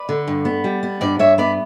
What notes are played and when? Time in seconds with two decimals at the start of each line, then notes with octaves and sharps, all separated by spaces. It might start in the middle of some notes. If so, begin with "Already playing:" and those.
Already playing: B4 D5
0.09 D3
0.27 G2
0.45 B3
0.64 G3
0.83 B3
1.01 G2 B4 D5
1.19 G2 C#5 E5
1.38 B3 B4 D5